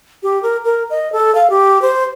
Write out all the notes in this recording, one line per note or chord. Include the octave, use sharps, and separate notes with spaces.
G4
A#4
A#4
D#5
A4
F5
G4
C5